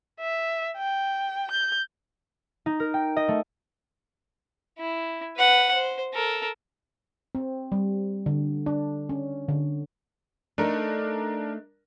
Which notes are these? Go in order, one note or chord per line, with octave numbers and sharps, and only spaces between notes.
E5
G5
G6
D#4
A#4
G5
D#5
A3
E4
B4 F#5
C5
A4 A#4
C4
G3
D3
D4
C#4
D3
A3 D4 D#4 A#4